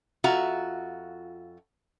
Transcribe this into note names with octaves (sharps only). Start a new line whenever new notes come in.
F2 F4 F#4 E5 A#5